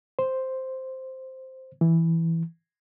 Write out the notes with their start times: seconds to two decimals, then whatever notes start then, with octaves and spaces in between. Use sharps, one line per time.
0.19 C5
1.81 E3